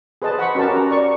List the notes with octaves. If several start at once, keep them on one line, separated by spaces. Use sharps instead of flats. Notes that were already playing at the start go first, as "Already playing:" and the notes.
G#4 B4 C5 D#5 A5
C5 F#5 B5 C#6
C#4 F#4 G4 A#4 A5
F#4 A#5
D5 C#6